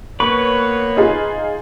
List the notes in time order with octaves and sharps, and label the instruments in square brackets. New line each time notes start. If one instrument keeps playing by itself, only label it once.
[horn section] A#3 B3 C#5 [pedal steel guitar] B4 [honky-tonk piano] C#6
[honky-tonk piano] D#4 F4 G#4